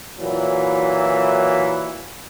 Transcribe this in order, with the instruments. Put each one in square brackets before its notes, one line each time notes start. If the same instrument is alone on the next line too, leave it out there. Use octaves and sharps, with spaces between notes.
[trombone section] A#2 E3 F#3